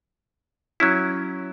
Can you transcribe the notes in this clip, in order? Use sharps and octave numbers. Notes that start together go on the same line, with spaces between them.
F#3 C#4 E4